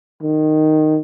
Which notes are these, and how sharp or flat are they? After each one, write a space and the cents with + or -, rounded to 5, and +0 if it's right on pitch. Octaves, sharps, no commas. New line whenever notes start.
D#3 -10